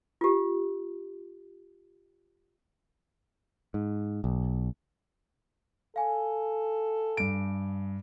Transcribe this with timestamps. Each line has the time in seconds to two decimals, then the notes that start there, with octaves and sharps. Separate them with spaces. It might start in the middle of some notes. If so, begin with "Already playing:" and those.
0.21 F4 G4
3.74 G#2
4.24 B1
5.96 A4 F5 G#5
7.17 G2 D7